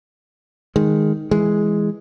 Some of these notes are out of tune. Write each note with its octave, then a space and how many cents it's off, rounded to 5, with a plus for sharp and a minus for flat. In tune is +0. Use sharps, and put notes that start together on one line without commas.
D#3 +5 G#3 +0
E3 +0 G#3 +0